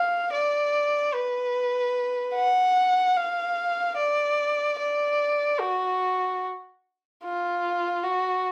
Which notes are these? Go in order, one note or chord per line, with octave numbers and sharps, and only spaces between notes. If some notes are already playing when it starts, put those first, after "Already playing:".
Already playing: F5
D5
B4
F#5
F5
D5
D5
F#4
F4
F#4